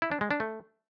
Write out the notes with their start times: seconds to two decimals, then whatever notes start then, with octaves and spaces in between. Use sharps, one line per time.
0.02 E4
0.12 D4
0.21 G#3
0.31 D4
0.40 A3